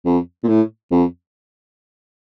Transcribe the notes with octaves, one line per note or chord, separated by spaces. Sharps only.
F2
A#2
A2
F2